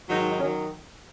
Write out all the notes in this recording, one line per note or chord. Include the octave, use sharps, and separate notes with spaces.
G#2 D#3 F#3 D#4
D#4
D#3 F#3 C#4